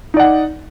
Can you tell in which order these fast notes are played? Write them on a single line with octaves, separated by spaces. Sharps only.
D#4 D5 F#5